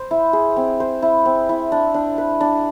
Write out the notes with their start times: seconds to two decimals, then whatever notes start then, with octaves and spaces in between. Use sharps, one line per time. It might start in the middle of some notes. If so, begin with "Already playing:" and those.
Already playing: C5
0.11 E4
0.33 G#4
0.56 C4
0.80 C5
1.02 E4
1.25 C4
1.49 E4
1.72 D4
1.94 D4
2.18 B4
2.41 D4